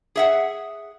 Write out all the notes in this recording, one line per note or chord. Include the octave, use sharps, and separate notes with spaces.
G#4 E5 F#5